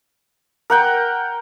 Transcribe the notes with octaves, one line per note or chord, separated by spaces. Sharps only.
A#4 F#5 G5